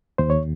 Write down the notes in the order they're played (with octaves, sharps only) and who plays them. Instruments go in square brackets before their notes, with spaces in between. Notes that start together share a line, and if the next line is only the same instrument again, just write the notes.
[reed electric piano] D#2 C5
C#5